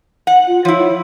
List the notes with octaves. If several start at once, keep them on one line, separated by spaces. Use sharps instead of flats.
F#5
F4
F3 E4 C#5